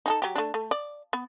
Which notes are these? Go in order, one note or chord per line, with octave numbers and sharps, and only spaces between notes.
D#4 G#4 A4
F#3 G4
A3 D4
A3
D5
B3